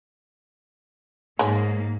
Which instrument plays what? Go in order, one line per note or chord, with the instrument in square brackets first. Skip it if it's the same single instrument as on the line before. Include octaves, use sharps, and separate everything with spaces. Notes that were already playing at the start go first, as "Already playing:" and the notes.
[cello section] G#2 A#3 [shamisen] G#3 C#5